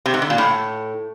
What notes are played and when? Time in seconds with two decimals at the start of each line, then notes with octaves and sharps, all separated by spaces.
0.06 C3
0.14 G#2
0.22 D3
0.30 A#2
0.38 A2